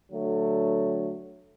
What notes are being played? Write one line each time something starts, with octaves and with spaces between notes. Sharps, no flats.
D3 F#3 A3